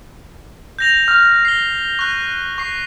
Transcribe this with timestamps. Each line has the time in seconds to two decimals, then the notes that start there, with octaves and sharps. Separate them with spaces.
0.79 G6 A#6 F7
1.08 F6
1.45 C7 G7
1.99 C#6 F#6
2.58 C#6 C7